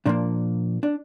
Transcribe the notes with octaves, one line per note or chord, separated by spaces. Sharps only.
A#2 F3 A#3 D4
D4